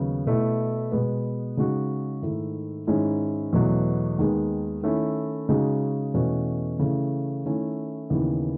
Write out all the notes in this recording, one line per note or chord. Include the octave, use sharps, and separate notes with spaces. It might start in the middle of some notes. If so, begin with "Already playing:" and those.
Already playing: D#2 C#3 F#3 B3 D#4
B2 A3 E4
B2 G#3 B3
C#3 G#3 D#4 F#4
G#2 D#3 A3 E4
G#2 D#3 G#3 C#4 E4
E2 B2 F#3 A3
D#2 D#3 G#3 B3
D#3 A3 C#4 E4
C#3 G#3 D#4 F#4
E2 B2 A3 C#4 F#4
C#3 E3 A3
D#3 A3 C#4 E4
D#2 C#3 E3 B3